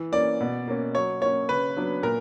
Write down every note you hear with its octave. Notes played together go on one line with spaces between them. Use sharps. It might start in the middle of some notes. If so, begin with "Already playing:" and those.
Already playing: E3
A#3 C#4 D5
B2
A#3 C#4
F#3 C#5
A#3 C#4 C#5
C#3 B4
F#3 B3 D4
A#2 A#4